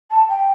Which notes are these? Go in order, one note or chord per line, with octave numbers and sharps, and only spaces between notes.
A5
G5